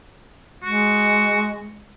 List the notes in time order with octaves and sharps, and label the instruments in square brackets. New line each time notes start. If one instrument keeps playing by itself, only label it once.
[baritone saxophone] G#3 [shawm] F#4